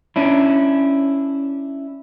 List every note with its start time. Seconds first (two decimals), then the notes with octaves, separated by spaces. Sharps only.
0.16 C#4 D4 E4